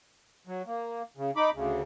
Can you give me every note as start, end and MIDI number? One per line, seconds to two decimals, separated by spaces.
0.47 0.62 54
0.67 1.02 58
1.17 1.31 49
1.36 1.50 63
1.36 1.50 83
1.36 1.50 86
1.54 1.82 38
1.54 1.82 49